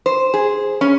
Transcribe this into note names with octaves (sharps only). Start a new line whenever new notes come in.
C5
G#4
C#4